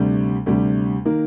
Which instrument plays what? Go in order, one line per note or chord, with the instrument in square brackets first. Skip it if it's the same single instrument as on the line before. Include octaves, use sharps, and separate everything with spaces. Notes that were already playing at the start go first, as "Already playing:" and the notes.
Already playing: [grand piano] D2 C3 G3
D2 C3 G3
D#3 A#3